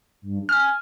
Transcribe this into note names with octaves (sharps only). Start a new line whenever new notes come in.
G2
G#5 F6